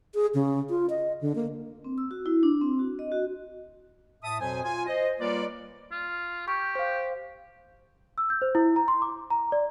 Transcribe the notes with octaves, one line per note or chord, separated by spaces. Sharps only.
G#4
C#3
F4
D#5
D3
A#3
C4
E6
F#4
E4
D4
C4
F#4
D#5
F#4
A2 E5 A5 D#6
F2 B2 F#3 C5 G#5
F4 G#5
C5 D#5
G3 A#3 F4 B4 C#5 D5
F4
G4 C#6 G6
C5 F5
E6
G6
C5
E4
A#5
C6
D6
A#5
D5